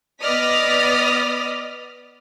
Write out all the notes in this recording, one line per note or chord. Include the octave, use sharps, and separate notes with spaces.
B3 D5 D#5 D#6 F6 B6